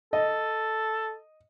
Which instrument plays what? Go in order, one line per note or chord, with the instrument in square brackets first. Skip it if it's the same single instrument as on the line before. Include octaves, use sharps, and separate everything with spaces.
[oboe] A4 [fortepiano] D#5